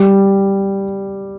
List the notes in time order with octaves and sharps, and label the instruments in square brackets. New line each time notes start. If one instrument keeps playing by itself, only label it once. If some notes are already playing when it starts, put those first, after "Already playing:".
Already playing: [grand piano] G3